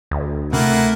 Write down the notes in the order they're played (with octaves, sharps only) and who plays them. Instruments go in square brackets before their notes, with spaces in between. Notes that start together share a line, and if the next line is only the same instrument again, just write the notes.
[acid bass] D2
[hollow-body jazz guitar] C3 [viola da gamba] A3 [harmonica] A#3 E4 F#5